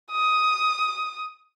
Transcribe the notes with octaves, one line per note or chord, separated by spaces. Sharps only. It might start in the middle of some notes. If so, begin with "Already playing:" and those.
D#6